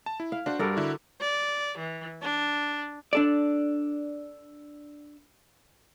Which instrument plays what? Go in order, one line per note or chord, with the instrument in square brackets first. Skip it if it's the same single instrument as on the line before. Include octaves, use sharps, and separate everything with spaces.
[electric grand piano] A5
E4
[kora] F5
[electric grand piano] D4 [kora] F#4 C5 F#5
[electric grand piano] G2 G3 [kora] A4 A#4 D5
[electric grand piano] D3 E4 F#4
[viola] D5
E3
D4
[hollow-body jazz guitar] D4 A4 D5